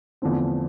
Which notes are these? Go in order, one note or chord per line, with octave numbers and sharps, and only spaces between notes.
E2 D3 F3 A3 C4